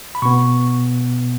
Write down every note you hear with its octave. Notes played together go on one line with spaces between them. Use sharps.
B5
B2 B3 C#6